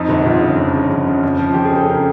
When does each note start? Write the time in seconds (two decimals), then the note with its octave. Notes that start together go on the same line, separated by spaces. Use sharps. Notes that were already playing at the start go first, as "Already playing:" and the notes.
Already playing: F2 D#4
0.09 G1
0.25 G1 F4
0.41 C#3
0.58 F2
0.74 C#3
0.90 F2
1.07 C#3
1.23 F2
1.39 F3
1.54 F2 G4
1.65 G#4
1.72 C#3 A4
1.88 C#3 A#4